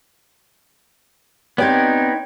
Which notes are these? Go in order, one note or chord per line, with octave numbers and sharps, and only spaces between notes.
B3 C4 D#4 G4 C#5 D5 G5 G#6